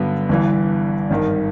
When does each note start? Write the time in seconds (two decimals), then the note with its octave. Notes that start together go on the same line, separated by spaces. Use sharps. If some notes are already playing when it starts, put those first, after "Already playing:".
Already playing: G2 D3 F#3 B3 D4
0.29 G1 G2 E3
1.10 G#1 G2 D#3